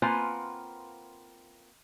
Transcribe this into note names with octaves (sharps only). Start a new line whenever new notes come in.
A#3 C4 F4 B4 F#5 G#5